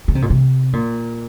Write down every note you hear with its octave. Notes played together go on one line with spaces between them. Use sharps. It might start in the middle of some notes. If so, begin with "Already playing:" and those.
C#3
C3
A#2
C3
A#2